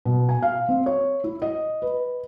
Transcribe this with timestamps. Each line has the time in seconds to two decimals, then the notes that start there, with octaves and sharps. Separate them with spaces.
0.05 B2
0.29 G#5
0.43 F5
0.69 C4
0.86 C#5
1.24 E4
1.42 D#5
1.82 B4